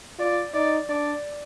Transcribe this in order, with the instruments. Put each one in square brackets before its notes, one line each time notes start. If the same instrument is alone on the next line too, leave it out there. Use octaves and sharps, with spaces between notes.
[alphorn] F4 [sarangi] D5
[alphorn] D#4 [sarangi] D5
[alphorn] D4 [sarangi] D5